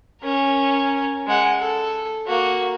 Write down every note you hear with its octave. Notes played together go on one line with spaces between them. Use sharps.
C#4 A#4
G#3 F#5
A4
A#3 F#4